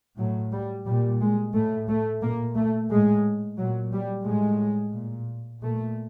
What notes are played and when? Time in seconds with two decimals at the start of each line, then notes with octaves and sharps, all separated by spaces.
0.18 A2 F#3
0.52 G3
0.86 A#2 G3
1.20 G#3
1.54 A2 A3
1.88 A3
2.22 A#2 A#3
2.56 A3
2.90 A2 G#3
3.58 A#2 F#3
3.92 G3
4.26 A2 G#3
4.94 A#2
5.62 A#2 A3